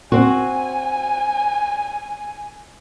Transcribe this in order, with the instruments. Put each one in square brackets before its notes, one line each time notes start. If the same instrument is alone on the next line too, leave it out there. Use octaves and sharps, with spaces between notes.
[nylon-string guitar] C4 F#4 [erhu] G#5